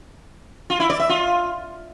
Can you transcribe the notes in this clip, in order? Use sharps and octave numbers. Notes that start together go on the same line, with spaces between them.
F4
E4
D5
E5
F4